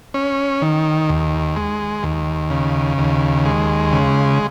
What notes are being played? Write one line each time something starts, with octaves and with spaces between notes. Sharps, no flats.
C#4
D#3
D#2
G#3
D#2
C#3
D#2
G#3
C#3